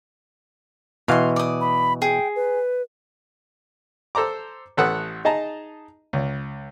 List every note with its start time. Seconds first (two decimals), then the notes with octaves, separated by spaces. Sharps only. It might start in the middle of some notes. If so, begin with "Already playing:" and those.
1.08 B2 E3 F5 C6
1.36 D5 D#6
1.61 B5
2.02 G#4 G5
2.36 B4
4.15 A4 C5 A#5 D6
4.77 A1 A4 B4 F#5 D#6 F#6
5.25 D#4 G#4 D#5 A5 A#5
6.13 C#2